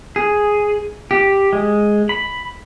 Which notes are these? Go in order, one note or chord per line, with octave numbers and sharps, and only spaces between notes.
G#4
G4
G#3
B5